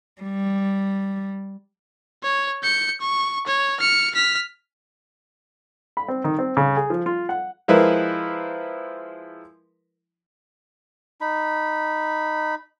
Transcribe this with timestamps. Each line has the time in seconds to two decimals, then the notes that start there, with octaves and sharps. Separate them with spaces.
0.22 G3
2.23 C#5
2.63 G6 C#7
3.01 C#6
3.47 C#5
3.80 F6 C#7
4.14 F6 B6
5.97 B5
6.08 C4
6.24 D#3
6.39 C4
6.57 C#3
6.77 G#4
6.90 F3
7.06 F4
7.29 F#5
7.68 F3 G#3 E4 A#4 B4
11.21 D#4 B5